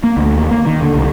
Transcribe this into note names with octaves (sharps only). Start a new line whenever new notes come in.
A#3
D2
D#2
A#3
D#3
D3
C2